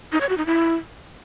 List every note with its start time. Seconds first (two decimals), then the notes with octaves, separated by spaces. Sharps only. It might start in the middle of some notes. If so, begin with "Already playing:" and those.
0.12 D#4
0.21 C#5
0.29 F#4
0.38 D#4
0.46 E4